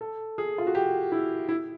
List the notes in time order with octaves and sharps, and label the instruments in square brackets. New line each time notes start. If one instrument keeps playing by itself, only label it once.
[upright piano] A4
G#4
F4
F#4
G4
E4
E4